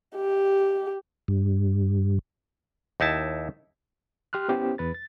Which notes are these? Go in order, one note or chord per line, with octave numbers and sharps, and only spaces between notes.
G4
G2
D#2 D#4 E4 A5
G4 C6 F6 F#6
B3 C#4 E4 G4 C5
E2 B4 A6
A6